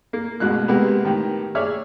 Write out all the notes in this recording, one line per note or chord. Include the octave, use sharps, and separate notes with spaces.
A#3
A1 B2 G#3 F#6
C3 G#3 A#3 B3
A2 D#3 G4
G#4 C#5 D5 E5 F6